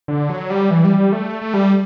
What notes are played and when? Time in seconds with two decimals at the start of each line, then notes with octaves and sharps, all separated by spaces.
0.08 D3
0.29 F#3
0.50 G3
0.71 E3
0.84 G3
0.98 G3
1.12 A3
1.42 A3
1.54 G3